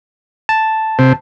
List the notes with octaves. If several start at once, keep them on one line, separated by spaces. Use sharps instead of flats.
A5
C3